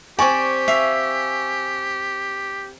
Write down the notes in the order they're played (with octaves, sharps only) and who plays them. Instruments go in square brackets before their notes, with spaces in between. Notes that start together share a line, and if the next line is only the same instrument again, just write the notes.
[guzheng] C4 D5 [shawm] G4 [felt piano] G#5 C#6
[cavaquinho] E5 [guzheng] F5